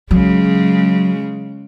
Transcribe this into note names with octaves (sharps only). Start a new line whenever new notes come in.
C#3 F#3 G#3